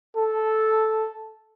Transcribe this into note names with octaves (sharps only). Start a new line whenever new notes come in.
A4